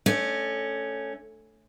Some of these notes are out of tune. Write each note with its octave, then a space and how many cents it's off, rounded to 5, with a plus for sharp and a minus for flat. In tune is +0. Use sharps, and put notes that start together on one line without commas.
A3 +0 C#4 +0 D5 +40